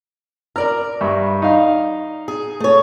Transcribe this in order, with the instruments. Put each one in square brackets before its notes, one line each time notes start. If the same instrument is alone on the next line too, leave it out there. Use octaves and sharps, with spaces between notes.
[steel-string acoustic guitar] A#4 D5 A#5 [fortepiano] F6
[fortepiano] G2 E5 C#6
D#4 F5
[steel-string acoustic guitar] G#4
A3 C#5